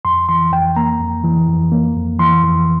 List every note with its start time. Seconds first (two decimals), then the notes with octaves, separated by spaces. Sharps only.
0.05 F2 C6
0.29 E3 C6
0.52 F2 G5
0.76 A#3 A#5
1.00 F2
1.24 E3
1.48 F2
1.72 A#3
1.96 F2
2.19 E3 C6
2.43 F2